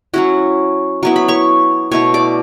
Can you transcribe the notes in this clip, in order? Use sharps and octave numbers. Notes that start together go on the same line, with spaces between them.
F#3 C#4 E4 F#4 F#5
F#3 B3 E4 C#6
B5
C#5 C#6
B2 A3 E4 C#5 C#6
D5 D6